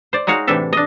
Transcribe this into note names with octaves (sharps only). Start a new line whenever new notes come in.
C5 D5
G#3 D#4 F#4 C#5 F5
A2 C3 E3 D4 A4 E5
D4 D#5